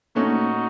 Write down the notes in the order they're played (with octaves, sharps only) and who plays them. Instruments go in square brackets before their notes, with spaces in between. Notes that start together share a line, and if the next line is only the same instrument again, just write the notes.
[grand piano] A#2 A3 C#4 [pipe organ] D#4 F#4